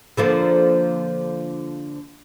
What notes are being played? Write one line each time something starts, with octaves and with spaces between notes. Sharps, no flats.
D3 F3 A#3